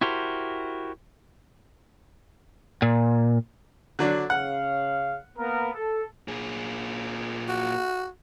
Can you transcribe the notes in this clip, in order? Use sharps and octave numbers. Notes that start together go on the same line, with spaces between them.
E4 F#4 G4 A#4 C5
A#2
D3 F#3 D4
C#3 F5 F#5
A#3 B3 A#4
A4
A#2 G#4
F#4